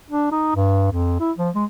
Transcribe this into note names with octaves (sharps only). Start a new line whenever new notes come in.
D4
D#4
G2
F2
E4
F3
G#3